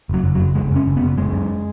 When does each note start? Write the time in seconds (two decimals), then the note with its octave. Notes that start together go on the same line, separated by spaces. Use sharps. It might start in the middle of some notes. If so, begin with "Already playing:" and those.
0.09 F#1 F#3
0.24 F#1
0.35 F#3
0.40 F#1
0.55 F#1 G#3
0.71 F#1 C#4
0.86 F#1
0.97 B3
1.02 F#1
1.18 F#1 G#3
1.33 F#2